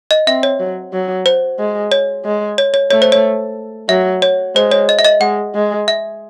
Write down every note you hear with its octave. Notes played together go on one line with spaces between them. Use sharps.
D#5
C4 E5
C#5
F#3
F#3
C5
G#3
C#5
G#3
C#5
C#5
A3 C#5
C5
C#5
F#3 E5
C#5
G#3 C5
C#5
D#5
E5
D#5
G#3 F#5
G#3
E5